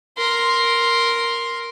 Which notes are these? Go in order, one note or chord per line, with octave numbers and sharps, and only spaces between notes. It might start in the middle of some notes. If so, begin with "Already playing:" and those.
A#4 C6